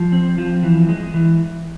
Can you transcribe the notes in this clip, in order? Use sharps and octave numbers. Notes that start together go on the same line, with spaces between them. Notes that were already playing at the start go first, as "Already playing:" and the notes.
Already playing: F3
C4
F3
E3
G#3
E3